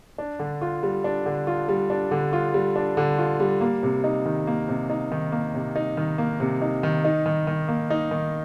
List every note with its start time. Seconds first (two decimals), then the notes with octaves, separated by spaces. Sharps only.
0.18 D4
0.39 D3
0.61 F4
0.83 G3
1.04 D4
1.26 D3
1.47 F4
1.69 G3
1.90 D4
2.11 D3
2.33 F4
2.54 G3
2.76 D4
2.97 D3
3.18 F4
3.40 G3
3.61 A#3
3.83 C3
4.04 D#4
4.26 D#3
4.47 A#3
4.69 C3
4.90 D#4
5.12 D#3
5.32 A#3
5.54 C3
5.76 D#4
5.97 D#3
6.18 A#3
6.40 C3
6.62 D#4
6.83 D#3
7.04 D#4
7.26 D#3
7.47 D#3
7.68 A#3
7.90 D#4
8.11 D#3